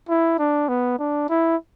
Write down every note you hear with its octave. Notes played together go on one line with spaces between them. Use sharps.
E4
D4
B3
D4
E4